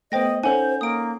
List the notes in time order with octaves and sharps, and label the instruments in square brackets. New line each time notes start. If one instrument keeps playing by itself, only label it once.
[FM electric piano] A3 B3 [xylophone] C5 G5 A#6 [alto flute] D#5
[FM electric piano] C#4 D#4 [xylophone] A4 F#5 G#5 [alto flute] C5
[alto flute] A#3 [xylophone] D#6 D7